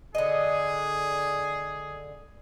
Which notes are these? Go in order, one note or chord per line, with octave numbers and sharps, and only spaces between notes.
D3 G#4 D#5